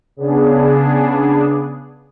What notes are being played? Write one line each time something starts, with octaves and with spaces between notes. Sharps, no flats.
C#3 B3 D4 G#4